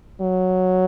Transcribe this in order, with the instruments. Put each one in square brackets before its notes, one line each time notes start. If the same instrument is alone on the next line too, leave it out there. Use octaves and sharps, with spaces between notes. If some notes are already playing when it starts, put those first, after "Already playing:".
[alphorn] F#3